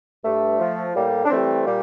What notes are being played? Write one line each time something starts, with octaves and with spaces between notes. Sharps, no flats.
G2 A3
F3
A2 G3 A#3
D4
E3 G3 A3 C4
A#2 G3 A#3